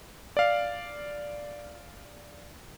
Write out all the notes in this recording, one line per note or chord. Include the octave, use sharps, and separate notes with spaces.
D5 F5